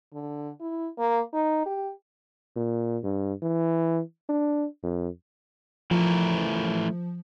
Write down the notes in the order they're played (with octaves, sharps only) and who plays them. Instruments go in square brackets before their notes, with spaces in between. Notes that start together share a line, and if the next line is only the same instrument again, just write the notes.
[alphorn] D3
E4
A#3
D#4
G4
[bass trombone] A#2
G2
E3
D4
F2
[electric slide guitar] E3 A3 A#4 [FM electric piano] F3